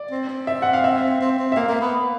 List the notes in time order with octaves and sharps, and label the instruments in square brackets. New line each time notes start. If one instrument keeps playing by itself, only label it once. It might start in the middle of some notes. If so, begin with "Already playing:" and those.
Already playing: [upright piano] D5
[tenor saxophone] C4
C4
[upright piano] E5
F#5
F5
E5
[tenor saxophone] C4
C4
[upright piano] E5
[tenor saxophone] A#3 [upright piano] F5
[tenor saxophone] A#3
B3